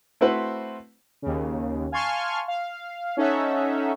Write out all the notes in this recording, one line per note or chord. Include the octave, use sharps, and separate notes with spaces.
A3 C4 E4 F#4 B4 C5
D#2 C#3
F5 G#5 A5 C6 C#6 F6
F5
C#4 D#4 A4 C#5 E5 F#5